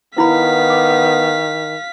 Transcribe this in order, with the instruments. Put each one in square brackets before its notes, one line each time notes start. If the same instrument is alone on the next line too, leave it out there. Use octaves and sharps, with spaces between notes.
[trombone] D#3 [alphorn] B3 [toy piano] E4 B5 [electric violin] F5 B6
[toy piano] D6